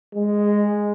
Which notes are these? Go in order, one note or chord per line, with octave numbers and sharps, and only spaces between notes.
G#3